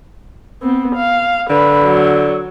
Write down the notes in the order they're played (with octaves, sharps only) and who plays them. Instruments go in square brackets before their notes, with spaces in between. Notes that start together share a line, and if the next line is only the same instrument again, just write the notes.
[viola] B3 C4
F5
[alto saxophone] D3 [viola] B4
[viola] F#3